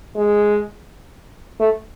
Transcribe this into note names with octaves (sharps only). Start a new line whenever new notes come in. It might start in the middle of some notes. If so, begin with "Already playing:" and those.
G#3
A3